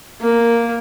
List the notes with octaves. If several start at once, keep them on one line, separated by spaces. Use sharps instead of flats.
A#3